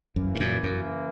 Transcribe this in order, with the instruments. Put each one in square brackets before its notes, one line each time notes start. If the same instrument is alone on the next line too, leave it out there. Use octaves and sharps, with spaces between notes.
[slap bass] F#2 [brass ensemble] C#3 E3 A#3
[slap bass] G2
F#2 A#2
F#2